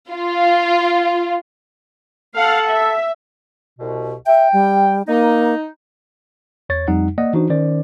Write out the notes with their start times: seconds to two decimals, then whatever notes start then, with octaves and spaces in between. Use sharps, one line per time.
0.11 F4
2.36 A4 F5 F#5
2.69 E5
3.79 C2 B2
4.27 E5 G5
4.53 G3
5.07 A#3 D#4
6.69 E2 C#5 A6
6.88 F2 G3 D#4 F#5
7.18 A#3 D5 D#5 F#5
7.33 E3 D4 D#4 F#4 C5
7.49 D#3 C#4 C5 D5